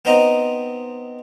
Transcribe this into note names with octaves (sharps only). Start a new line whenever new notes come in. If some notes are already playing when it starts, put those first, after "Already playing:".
B3 C4 D#4 D#5 A#5